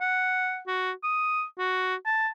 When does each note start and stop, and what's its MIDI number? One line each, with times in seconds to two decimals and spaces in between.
0.01 0.60 78
0.67 0.92 66
1.04 1.43 87
1.59 1.95 66
2.06 2.28 81